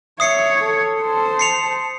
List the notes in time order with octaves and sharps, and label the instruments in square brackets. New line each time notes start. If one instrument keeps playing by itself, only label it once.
[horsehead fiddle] C#5 [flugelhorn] E5 [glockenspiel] D#6 C7 C#7
[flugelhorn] A4
[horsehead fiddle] C5 A5
[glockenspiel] C7 C#7 F7